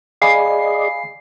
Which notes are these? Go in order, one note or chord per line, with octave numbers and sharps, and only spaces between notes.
G#4 D5 D#5 F5 G#5 B5 C7